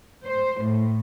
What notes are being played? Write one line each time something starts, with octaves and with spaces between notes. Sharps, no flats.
C5
A2